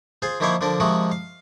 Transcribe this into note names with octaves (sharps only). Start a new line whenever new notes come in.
F4 G#4 C5
D#3 F3 A#3 E4 C5 C#5
D3 F3 D4 A#4
C3 D#3 F3 G#3 F#4
F5